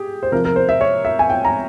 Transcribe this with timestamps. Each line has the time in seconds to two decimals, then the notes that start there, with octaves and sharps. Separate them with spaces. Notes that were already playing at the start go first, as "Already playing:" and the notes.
Already playing: G4 G#4
0.23 C5
0.32 C3 F3 A#4
0.45 A#4
0.56 C5
0.69 E5
0.81 C#5
1.05 E5
1.19 G#5
1.30 G5
1.45 A#5